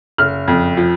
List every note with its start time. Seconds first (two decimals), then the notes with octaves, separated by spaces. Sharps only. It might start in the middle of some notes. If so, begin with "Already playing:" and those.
0.18 F#1 F6
0.48 F2
0.77 F3